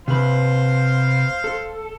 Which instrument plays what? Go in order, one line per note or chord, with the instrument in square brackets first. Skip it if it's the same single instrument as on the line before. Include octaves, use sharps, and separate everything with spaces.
[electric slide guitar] C3 B4 [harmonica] C5 F5 C6
[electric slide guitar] A4